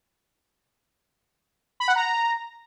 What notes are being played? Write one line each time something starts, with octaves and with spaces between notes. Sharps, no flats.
B5
F#5
A#5